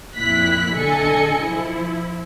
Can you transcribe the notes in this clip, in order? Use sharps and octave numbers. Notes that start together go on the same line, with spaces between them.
F2 A#2 E4 F#6 B6
B1 D3 A4 D#5 G#5 C#7
F3 E4